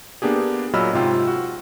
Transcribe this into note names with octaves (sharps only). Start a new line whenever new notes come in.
A#3 B3 D4 G4 G#4
A#2 F#3 D#5 B5 E6 F6
G#2 C3 F4 G5
F#4